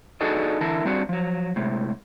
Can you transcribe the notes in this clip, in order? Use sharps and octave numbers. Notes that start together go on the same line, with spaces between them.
D4 D#4 F#4 G#4 A4 D#5
D3 E3 E4 A#4 A5
G3 C4 D4 F#4
F3 F#3
A2 C3 G#3